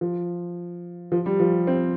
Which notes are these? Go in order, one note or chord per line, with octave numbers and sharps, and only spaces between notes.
F3
F3
G3
F3
C4